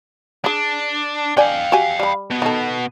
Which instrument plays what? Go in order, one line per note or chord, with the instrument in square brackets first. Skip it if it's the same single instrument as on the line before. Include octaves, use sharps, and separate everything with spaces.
[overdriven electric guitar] D4 [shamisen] G#4 B5
[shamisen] D3 D5 G#5 [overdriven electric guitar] F5 G5
[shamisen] F#4 G4 G#5
G3 B5
[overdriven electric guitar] B2 B3
[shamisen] D#3 A4